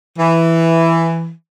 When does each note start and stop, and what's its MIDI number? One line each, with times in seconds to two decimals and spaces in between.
0.18 1.30 52